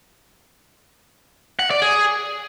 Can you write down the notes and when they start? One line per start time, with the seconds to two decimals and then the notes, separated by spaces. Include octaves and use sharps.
1.59 F#5
1.71 D5
1.82 G#4